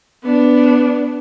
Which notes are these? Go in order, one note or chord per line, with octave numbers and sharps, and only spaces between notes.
B3 D4